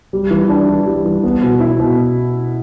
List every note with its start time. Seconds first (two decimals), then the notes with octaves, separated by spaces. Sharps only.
0.13 G3
0.31 E3
0.49 D4
0.68 E3
0.86 G3
1.05 E3
1.23 B3
1.42 B2
1.60 E4
1.79 B2